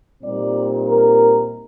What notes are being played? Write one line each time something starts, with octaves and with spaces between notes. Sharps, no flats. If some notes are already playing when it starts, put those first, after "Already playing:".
A#2 G3 C4 D#4 D5
A#4